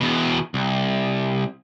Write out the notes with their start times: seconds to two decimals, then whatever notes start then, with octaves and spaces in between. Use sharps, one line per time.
0.01 E2 B2
0.54 C2